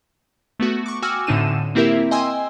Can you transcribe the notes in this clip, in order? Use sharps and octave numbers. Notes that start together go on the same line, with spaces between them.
A3 B3 F#4
C#6 D6
F#4 G5 G#5 D6 E6 F6
A2 D3 C4 D#4 D#7 E7
A#3 C4 E4 G4 A#4 E5
D#5 G5 G#5 C6 E6